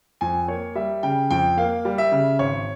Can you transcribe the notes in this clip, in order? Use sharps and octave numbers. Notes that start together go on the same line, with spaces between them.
F2 G#5
A#3 C#5
G3 E5
C#3 G5
F2 G5
A#3 F5
G3
E5
C#3
G#1 C#5